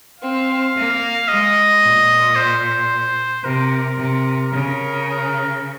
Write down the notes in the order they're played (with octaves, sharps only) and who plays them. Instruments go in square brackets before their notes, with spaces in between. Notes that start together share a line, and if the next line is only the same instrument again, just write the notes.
[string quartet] C4 [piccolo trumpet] F5
[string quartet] A#3
[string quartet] G#3 [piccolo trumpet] D#5
[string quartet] A#2
[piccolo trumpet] C5
[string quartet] C3 [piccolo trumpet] A#4
[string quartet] C3
[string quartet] C#3 [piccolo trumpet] A#4